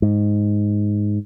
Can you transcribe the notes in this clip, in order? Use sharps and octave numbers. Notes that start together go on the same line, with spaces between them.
G#2